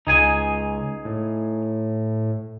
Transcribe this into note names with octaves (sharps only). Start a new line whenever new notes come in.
C#2 D#4 G#4 G#5
A2